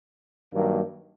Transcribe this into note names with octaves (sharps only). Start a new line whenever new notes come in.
G2 D#3 F#3 A#3